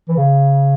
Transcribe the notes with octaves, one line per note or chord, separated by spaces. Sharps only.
E3
C#3